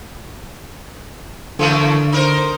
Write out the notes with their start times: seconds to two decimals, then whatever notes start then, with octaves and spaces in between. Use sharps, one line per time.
1.59 D3 E3 A3 A#3
2.12 D#4 A#4 C5